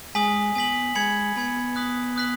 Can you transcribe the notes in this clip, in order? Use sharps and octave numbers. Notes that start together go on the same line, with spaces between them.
G#3 G#5 D#6 B6 F#7
B3 G#5 D#6 B6 F#7
G#3 G#5 B5 G#6 C#7 F#7
B3 G#5 B5 G#6 C#7 F#7
D#6 F#6 B6 F#7
D#6 F#6 B6 F#7